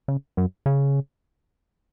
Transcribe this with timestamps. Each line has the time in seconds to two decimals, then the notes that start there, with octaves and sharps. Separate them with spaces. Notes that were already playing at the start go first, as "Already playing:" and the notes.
0.08 C#3
0.37 F#2
0.66 C#3